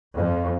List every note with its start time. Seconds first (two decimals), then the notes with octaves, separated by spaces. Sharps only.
0.17 F2